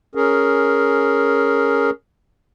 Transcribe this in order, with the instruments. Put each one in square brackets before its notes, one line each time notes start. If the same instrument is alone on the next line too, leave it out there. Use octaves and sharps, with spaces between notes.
[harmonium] C#4 G#4 A#4